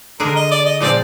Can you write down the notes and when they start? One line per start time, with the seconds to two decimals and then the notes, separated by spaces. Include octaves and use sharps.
0.20 D3 G#3 D4 G#4 A#4
0.36 D#5
0.51 D5
0.65 D#5
0.80 A#2 F3 G#3 C4 D5